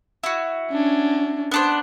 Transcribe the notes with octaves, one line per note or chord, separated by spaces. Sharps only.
E4 F#4
C#4 D4
B3 D4 C5